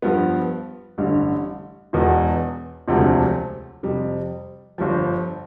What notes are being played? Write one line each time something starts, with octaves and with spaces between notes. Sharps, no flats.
G2 F3 B3
A1 G2 D3
E1 E2 B2 B3
E1 D2 C3 F3 A3
F2 C3 G3
G1 G2 F3